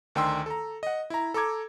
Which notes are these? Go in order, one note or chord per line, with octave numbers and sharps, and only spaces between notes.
D2 D#3 D4 G5 C6 E6
A4 A#5
D#5 F#5
E4 A#5
A4 A#5 D6 G#6